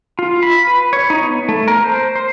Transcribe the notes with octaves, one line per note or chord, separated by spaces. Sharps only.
F4
B5
B4
C#5
D#4
B3
A3
A#4
C5
C5